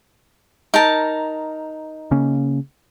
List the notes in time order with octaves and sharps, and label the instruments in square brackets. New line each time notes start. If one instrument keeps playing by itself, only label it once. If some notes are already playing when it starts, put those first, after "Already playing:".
[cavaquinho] D#4 A#4 A5
[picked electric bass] C#3 A#3 C#4